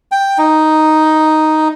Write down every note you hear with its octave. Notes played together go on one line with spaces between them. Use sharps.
G5
D#4